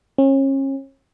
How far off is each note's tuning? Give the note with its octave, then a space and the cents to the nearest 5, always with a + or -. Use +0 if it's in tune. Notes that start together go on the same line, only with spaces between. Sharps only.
C#4 -35